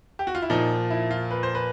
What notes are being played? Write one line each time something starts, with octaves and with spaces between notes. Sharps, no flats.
G4
F#4
F4
E4
A#2 F3 D#4
E4
F4
B4
C5
B4